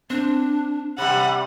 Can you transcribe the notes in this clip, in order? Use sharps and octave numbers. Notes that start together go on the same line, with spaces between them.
C4 D4
C3 G3 F#5 B5